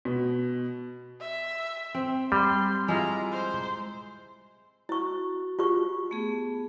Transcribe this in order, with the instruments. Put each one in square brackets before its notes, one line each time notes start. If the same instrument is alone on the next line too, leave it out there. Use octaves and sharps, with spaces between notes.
[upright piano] B2
[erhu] E5
[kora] C4
[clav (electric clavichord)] G3 [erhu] C6
[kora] G#3 E4 F4 [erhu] A#5
[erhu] C5
[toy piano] E4 C#6 [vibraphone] F#4
[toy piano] F4 G4 C#6
[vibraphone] A3 B3 G#4